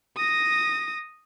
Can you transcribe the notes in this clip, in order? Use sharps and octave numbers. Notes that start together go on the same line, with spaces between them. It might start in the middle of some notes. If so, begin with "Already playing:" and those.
D#6 A#6